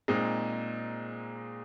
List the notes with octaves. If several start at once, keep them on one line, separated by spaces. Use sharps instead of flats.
A#2 G#3 C4 D#4